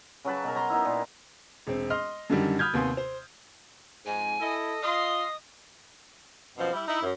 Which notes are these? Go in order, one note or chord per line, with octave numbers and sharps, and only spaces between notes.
C#3 F#3 B4 A5
B2 A#4
C#5 A#5 C6
B3 D#4 E4
A#2
E1 C4
D#5 C6 F6
F#2 D3 D#3 G3
B5 D#6 F6 G6 G#6
D#2 C3 B3 G#5 C6 G6
C5
F2 G#2 G#5
E4 A4 D#5
F4 D#5 F5 C6 D#6
F#2 B2 F3 C4
G3 E4
D#4 E4
F#2